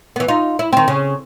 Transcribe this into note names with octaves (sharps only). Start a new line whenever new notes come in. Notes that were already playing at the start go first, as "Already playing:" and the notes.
E3 B3
D#4 F4
E4
D#3 C4
C#3